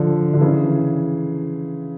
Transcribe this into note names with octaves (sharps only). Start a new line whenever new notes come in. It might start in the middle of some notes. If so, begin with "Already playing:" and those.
Already playing: D3 F3
D3
C#3 E3